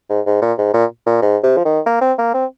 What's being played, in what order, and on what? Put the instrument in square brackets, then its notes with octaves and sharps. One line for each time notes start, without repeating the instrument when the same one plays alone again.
[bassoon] G#2
G#2
A#2
G#2
A#2
A#2
G#2
C3
F3
D#3
A#3
C4
A#3
C4